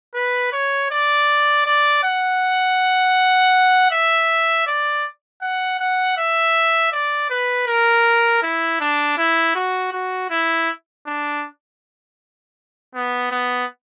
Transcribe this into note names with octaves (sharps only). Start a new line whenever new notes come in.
B4
C#5
D5
D5
F#5
E5
D5
F#5
F#5
E5
D5
B4
A#4
E4
D4
E4
F#4
F#4
E4
D4
B3
B3